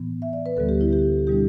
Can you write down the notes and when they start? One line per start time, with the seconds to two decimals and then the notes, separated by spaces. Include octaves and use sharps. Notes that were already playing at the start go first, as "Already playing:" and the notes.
Already playing: A2 E3 B3
0.22 E5
0.33 D5
0.46 B4
0.56 D2 D3 G3 B3 A4
0.69 G4
0.81 E4
0.93 G4
1.27 B2 G3 D4 G4